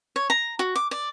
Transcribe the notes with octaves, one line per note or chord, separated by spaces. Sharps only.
C#5
A#5
F#4
D6
D5